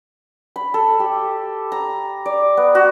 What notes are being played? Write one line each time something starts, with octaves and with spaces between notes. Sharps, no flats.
B5
A4
G4
A#5
D5
B3
F#4